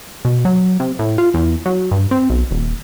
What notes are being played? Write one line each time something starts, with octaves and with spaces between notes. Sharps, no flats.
B2
F#3
C3
A2
F4
E2
F#3
G2
C4
B1
D#1